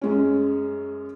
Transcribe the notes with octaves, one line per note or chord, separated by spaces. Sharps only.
F#2 G#3 C#4